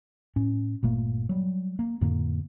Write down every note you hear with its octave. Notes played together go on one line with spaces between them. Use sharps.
A2 C#4
G1 A#2 A3 A#3
F#3 G3
A#3
F2 A2 D3 A#3